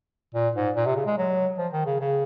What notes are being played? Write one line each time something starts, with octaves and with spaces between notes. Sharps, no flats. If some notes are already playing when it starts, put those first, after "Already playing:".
A#2
G#2
A#2
C3
C#3
G#3
F#3
F3
D#3
C#3
C#3